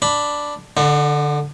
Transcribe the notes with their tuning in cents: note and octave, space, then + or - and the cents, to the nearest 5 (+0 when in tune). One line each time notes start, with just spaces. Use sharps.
D4 +0 B5 +0
D3 +0 D4 +45